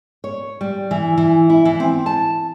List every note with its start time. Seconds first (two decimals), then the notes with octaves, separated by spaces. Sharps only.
0.24 C#5
0.61 G3
0.91 E3
1.18 E3
1.50 E4
1.65 E3
1.80 C4
2.06 A5